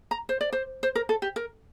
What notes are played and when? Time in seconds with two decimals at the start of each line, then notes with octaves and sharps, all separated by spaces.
0.11 A#5
0.29 C5
0.41 D5
0.52 C5
0.83 C5
0.95 A#4
1.09 A4
1.22 G4
1.36 A#4